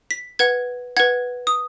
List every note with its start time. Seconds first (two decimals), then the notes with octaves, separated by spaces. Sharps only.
0.11 B6
0.39 B4 F#5 G#6
0.97 B4 F#5 G#6
1.47 D#6